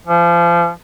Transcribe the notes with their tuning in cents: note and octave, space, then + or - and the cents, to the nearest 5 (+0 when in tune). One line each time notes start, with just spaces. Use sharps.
F3 -30